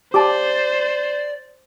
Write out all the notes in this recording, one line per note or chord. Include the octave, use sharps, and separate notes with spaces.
G4 C5 D5 A5 D6